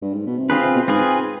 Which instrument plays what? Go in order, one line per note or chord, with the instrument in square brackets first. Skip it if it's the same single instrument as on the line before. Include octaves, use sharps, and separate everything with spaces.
[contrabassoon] G2
G#2
B2
C3
[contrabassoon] D3 [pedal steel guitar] C4 F4 G#4 B4
[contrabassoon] C3
B2
[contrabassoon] G#2 [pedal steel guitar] C4 F4 G#4 B4